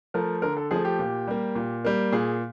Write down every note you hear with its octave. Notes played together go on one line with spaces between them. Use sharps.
F3 A3 A#4
D3 A#4
A4
F3 A3 G#4
G4
A#2
G3 A#3
A#2
G3 A#3
A#2 G#4